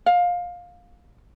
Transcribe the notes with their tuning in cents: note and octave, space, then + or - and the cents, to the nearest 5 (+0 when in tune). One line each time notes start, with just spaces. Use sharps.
F5 +20